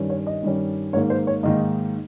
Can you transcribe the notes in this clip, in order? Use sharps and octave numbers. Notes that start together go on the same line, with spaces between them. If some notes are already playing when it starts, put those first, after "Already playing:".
Already playing: G2 D#3 G3 C#4
C#5
D#5
G2 D#3 G3 C#4
G#2 D#3 A#3 D#4 C#5
C5
C#5
G#2 D#3 A#3 D#4 D#5